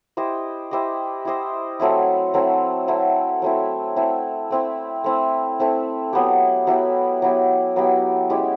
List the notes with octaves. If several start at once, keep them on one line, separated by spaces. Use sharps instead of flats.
E4 G4 C5 D#5
E4 G4 C5 D#5
E4 G4 C5 D#5
F#3 A3 C4 E4
F#3 A3 C4 E4
F#3 A3 C4 E4
F#3 A3 C4 E4
A3 C4 E4
A3 C4 E4
A3 C4 E4
A3 C4 E4
F#3 B3 E4 G4
F#3 B3 E4 G4
F#3 B3 E4 G4
F#3 B3 E4 G4
G#3 C#4 E4 G4